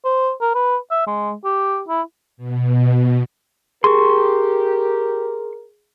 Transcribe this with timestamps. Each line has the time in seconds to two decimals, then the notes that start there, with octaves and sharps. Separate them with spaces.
0.05 C5
0.41 A#4
0.55 B4
0.91 E5
1.07 G#3
1.44 G4
1.89 E4
2.37 B2
3.84 G4 G#4 A#4 C6 C#6